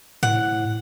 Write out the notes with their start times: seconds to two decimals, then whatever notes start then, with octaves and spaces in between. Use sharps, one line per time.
0.23 A2 F#5